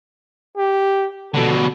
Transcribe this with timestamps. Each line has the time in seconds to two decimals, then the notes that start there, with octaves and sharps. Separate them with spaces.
0.57 G4
1.34 B2 D3 A4